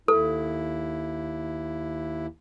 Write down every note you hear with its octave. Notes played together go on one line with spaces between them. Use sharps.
D#2 E4 A4